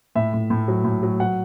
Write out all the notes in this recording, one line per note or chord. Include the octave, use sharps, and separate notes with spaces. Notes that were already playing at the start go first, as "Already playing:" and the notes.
A2 E5
A2
A2
F#3
A2
F#3
F#3 F#5